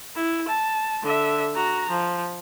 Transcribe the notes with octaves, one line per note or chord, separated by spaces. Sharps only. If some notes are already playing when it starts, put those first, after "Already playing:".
E4
A5
D3 E5
F#4 A#5
F3